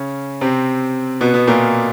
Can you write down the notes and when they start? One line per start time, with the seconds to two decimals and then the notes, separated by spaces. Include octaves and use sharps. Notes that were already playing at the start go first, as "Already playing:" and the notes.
Already playing: C#3 C#4
0.41 C3 C4
1.21 B2 B3
1.34 B2 B3
1.47 A#2 A#3